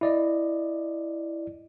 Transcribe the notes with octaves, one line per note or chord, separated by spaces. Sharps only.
E4 D5 D#5